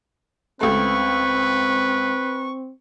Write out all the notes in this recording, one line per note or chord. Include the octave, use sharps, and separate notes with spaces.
C#2 A3 C4 B4 C#6